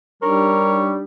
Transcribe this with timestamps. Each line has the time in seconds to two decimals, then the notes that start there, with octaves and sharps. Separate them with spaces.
0.22 G3 D4 D#4 G4 A#4 C#5